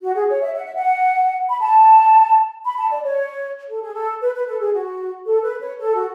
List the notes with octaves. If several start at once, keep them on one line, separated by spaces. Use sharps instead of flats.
F#4
G#4
C#5
E5
F#5
E5
F#5
B5
A5
B5
A5
D5
C#5
A4
G#4
A4
B4
B4
A4
G#4
F#4
A4
B4
C#5
A4
F#4